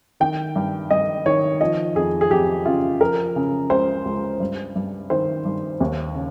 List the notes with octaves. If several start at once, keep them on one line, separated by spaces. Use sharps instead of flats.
D#3 G5
G2
G2 D#5
D#3 C#5
F3 D#5
F2 G#4
G#4
F2 G4
C#3 F4
F3 A#4
C#3
C#2 C5
C#2
G2
G2
D#3 C5
G2
D#2
C#3